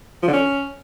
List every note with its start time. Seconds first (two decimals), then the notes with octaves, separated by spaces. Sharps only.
0.23 F3
0.28 D3
0.33 C#4